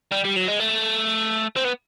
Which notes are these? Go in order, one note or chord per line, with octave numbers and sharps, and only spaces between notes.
G3
G3
F#3
G#3
A3
C4
B3